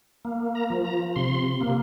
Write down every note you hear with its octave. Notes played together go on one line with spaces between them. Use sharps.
A#3
A#5
F3
A#5
C3 C6
A#3